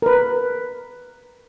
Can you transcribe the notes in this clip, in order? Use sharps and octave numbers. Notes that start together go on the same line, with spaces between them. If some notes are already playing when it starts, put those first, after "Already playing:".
A#4 B4